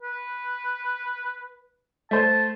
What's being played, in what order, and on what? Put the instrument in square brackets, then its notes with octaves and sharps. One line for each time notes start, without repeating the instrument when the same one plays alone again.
[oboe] B4
[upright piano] A3 C5 [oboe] A5